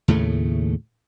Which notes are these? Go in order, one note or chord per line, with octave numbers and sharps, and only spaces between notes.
D#2 A2 C#3 A3